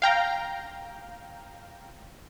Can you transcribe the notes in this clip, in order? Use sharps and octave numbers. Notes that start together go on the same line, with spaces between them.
F5 G5 A#5